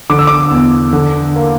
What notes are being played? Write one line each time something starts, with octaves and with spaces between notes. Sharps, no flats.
D3 D6
E6
D6
E2
D3
A#3